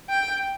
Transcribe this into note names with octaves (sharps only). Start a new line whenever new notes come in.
G5